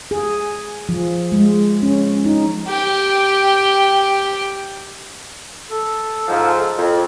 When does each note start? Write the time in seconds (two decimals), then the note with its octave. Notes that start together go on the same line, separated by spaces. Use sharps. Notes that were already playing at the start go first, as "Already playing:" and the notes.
0.11 G#4
0.89 F3
1.32 G#3
1.83 C#4
2.25 D#4
2.68 G4 G5
5.69 A4
6.28 G#2 F3
6.78 F2